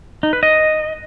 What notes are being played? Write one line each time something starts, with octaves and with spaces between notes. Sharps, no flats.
D#4
B4
D#5